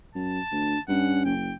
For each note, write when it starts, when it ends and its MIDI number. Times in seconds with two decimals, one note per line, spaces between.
0.15 0.40 42
0.15 0.82 81
0.52 0.75 38
0.52 0.80 62
0.89 1.23 43
0.89 1.34 61
0.89 1.23 78
1.26 1.52 30
1.26 1.56 79